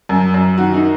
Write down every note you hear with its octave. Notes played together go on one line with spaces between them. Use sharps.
F#2
F#2
D#3 F#4
D#4